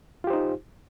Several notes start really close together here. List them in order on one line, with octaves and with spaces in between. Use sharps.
F4 G4 C5 D#4